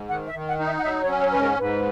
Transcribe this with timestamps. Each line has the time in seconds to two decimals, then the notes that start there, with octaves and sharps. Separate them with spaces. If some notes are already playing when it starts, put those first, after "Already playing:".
Already playing: G#2
0.09 D#3 F#5
0.28 E5
0.34 D#3
0.47 F#5
0.59 D#4
0.66 E5
0.78 F#5
0.84 F#3 E5
1.03 C#5
1.09 C#4
1.21 C#5
1.31 G#2 B4
1.41 A#4
1.59 G#2 B4